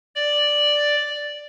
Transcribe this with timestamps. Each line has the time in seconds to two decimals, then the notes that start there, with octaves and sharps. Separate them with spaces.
0.15 D5